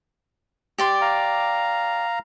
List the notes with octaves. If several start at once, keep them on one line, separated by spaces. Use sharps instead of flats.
G4 D5 C6
F5 A#5